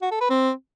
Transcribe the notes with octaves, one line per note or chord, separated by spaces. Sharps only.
F#4
A4
B4
C4